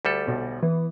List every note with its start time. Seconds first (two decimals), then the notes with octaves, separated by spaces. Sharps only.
0.05 D2 G3 A4
0.27 B1
0.63 E3 B3